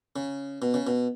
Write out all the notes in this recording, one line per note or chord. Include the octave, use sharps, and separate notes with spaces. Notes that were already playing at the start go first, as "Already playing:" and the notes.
C#3
B2
C#3
B2